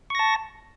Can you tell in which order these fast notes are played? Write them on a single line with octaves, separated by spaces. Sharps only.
C#6 A#6 A5